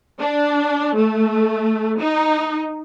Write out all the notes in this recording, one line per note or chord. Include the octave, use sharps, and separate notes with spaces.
D4
A3
D#4